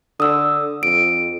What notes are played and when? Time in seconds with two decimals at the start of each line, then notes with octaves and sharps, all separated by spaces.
0.20 D3 D#6 E6
0.83 F2 D7